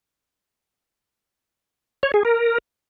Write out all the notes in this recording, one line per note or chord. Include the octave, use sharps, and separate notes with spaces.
C#5
G#4
A#4